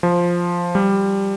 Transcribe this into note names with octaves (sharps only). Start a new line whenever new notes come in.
F3
G3